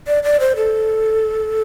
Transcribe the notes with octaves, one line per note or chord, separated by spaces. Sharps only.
D5
D5
C5
A4